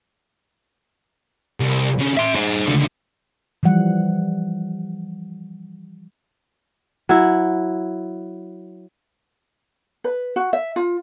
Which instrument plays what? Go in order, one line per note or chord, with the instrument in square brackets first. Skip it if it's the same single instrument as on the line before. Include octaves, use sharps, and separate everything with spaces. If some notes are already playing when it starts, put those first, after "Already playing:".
[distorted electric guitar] C2
D3 C#4
E5 C6
G#4 C5
C#2 D3
[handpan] E3 F3 G3 F#5
[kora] F#3 E4
[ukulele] B4
F#4
E5
F4